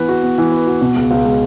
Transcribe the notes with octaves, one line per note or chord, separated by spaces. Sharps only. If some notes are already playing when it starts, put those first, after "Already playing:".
Already playing: E3 B3 B4
F#4
B3
E3
B4
F#4
B2
C#2
C#2
G#3